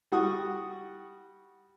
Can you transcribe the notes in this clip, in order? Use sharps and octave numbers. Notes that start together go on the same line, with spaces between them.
G3 F#4 F#5 C#6 D#6